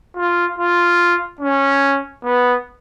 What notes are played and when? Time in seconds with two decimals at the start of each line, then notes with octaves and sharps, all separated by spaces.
0.17 F4
0.58 F4
1.40 C#4
2.24 B3